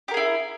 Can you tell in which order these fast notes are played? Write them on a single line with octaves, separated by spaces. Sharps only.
G4 A#4 G#4 E4